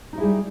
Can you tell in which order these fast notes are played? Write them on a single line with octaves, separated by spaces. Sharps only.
D#4 F#4 E4 G#4 G3